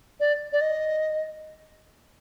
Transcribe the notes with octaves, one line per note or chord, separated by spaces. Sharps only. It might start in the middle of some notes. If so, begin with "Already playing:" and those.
D5
D5
D#5